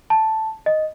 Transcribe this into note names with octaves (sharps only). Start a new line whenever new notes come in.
A5
D#5